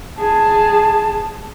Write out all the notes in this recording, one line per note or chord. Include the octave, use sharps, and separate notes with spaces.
G#4 A5